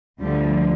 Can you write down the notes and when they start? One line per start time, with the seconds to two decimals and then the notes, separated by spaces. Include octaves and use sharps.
0.21 D2 D3 F3 G3